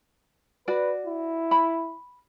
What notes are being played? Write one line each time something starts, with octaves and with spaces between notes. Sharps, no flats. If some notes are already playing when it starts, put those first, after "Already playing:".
F#4 B4 D5
E4
B5